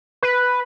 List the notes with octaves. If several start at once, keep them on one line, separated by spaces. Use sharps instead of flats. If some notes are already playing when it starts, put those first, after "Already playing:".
B4